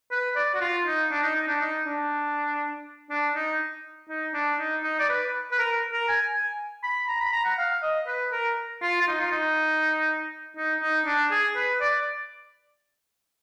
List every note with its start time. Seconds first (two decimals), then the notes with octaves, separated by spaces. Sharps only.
0.11 B4
0.36 D5
0.55 F#4
0.61 F4
0.86 D#4
1.11 D4
1.23 D#4
1.36 D#4
1.47 D4
1.61 D#4
1.86 D4
3.10 D4
3.35 D#4
4.09 D#4
4.34 D4
4.59 D#4
4.84 D#4
4.99 D5
5.09 B4
5.52 B4
5.59 A#4
5.92 A#4
6.09 G#5
6.33 G#5
6.83 B5
7.08 A#5
7.21 B5
7.33 A#5
7.45 F#5
7.58 F5
7.83 D#5
8.07 B4
8.32 A#4
8.82 F4
9.01 F4
9.08 D#4
9.21 F4
9.32 D#4
10.57 D#4
10.81 D#4
11.06 D4
11.31 G#4
11.56 B4
11.81 D5